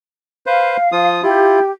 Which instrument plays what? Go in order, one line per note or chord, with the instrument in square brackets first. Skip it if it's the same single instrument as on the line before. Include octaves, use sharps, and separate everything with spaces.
[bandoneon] B4 C5 [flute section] F5
[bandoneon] F3 F4 D#6
[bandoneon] E4 F4 [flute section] G4